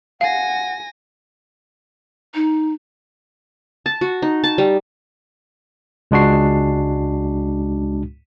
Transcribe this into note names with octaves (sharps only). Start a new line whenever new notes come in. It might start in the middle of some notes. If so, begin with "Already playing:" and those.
F5 F#5 G#5 A#6
D#4
A5
F#4
D#4
A5
G3
C#2 G#3 D4 F#4 C7